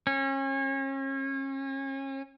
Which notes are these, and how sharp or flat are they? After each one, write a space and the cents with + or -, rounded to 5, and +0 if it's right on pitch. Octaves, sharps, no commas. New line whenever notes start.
C#4 -35